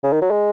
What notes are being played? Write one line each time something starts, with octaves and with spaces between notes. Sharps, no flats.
C#3
D#3
F#3
G#3